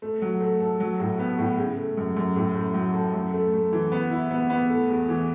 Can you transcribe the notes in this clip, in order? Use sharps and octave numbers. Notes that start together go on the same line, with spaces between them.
A3
F#3
A3
A4
F#3
A2
B3
A2
C#3
A3
F#2
F#2
A2
A2
F#3
A4
F#2
A3
A3
E3
B3
E4
B3
B3
A3
E2
E3